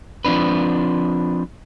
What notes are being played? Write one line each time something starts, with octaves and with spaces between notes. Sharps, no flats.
F3 C4 D4 B4